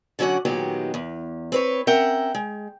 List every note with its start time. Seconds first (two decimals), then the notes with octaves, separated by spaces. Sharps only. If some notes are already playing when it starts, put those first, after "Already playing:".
0.19 D3 F#3 C#4 D5 F#5
0.45 A#2 D#3 F#3 G#3 B3 G4
0.94 E2
1.52 C4 B4 C#5
1.87 C4 C#4 A#4 E5 F#5 G5
2.35 G#3